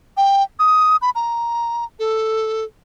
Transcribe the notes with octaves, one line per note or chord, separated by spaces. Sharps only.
G5
D#6
B5
A#5
A4